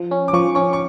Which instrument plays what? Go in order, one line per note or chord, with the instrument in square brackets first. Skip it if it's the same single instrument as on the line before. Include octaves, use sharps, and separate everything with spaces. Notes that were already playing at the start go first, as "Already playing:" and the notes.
Already playing: [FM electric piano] F3
C#4
[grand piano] D6
[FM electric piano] F3 [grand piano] C#6
[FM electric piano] C#4 [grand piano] C#6
[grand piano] C#6